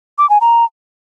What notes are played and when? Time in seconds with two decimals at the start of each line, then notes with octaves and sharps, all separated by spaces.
0.18 D6
0.30 G#5
0.41 A#5